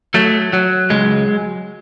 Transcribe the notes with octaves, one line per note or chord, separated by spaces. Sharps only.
F#3 A3
F#3
C#2 G#3